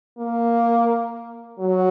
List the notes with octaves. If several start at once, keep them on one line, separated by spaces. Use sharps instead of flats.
A#3
F#3